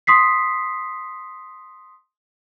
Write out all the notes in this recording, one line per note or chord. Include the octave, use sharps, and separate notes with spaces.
C6 D#6 B6 C7